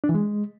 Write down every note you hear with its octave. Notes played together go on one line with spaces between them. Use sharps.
D4
E3
G#3